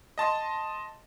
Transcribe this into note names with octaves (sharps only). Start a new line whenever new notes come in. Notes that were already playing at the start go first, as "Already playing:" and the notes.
D#5 A5 C6